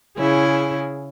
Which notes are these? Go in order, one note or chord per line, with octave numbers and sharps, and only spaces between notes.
C#3 E4 G#4